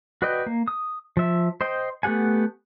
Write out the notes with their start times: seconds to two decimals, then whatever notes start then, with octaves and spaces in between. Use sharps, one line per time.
0.22 F#4 B4 D5 D#5 G5
0.46 A#3
0.68 D#6
1.17 F3 E5
1.61 C5 D#5 G5
2.03 A3 B3 G4 F#5 G#5